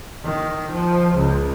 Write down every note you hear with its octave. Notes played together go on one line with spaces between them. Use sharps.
D#3
F3
C#2